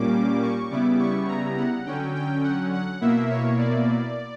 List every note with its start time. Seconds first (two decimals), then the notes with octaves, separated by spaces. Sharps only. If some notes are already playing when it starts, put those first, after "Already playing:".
Already playing: A#2 G3 A#3 C#4 D6
0.42 C#6
0.71 C#3 G3 B3 E4 D6
0.99 C#6
1.29 A#5
1.57 F#5
1.86 D3 F#3 C#4 G5
2.15 G5
2.43 F#5
2.73 F#5
3.01 B2 A#3 E4 E5
3.30 C#5
3.59 D5